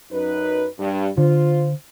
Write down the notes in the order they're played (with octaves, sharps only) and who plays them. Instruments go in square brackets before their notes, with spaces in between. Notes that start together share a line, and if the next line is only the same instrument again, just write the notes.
[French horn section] F#2 D#4 B4
G2
[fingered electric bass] D3 [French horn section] F4 C5